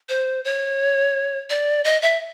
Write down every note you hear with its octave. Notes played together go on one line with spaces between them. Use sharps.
C5
C#5
D5
D#5
E5